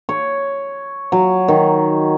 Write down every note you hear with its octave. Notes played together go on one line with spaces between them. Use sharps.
C#5
F#3
D#3